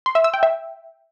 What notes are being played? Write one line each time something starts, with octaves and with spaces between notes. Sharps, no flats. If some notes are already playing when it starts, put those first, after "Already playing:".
C6
E5
E6
G5
E5